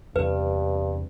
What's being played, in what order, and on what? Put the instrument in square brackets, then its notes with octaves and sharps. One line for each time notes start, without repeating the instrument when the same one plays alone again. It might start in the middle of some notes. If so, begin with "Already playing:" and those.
[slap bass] E2 C3 [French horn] G2 [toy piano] B4